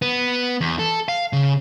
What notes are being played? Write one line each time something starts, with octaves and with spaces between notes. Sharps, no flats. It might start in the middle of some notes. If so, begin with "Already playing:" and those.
B3
E2
A4
F5
C#3